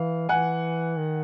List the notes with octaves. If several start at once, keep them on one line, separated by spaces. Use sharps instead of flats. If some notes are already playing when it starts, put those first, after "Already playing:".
Already playing: E3 F5
E3 F#5 G#5
D#3